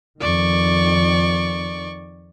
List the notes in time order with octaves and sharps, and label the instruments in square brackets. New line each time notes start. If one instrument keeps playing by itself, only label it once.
[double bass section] F2 D#3 [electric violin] D5 C#6